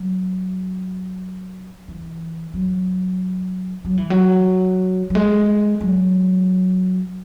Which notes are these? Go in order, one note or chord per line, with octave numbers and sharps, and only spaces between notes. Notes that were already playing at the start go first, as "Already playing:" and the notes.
Already playing: F#3
E3
F#3
F#3
E3
F#3
F#3
G#3
F#3